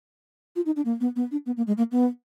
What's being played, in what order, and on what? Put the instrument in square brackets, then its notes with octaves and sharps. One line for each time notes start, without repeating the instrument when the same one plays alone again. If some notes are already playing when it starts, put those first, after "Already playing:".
[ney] F4
D#4
D4
A#3
B3
B3
D4
B3
A#3
G#3
A#3
B3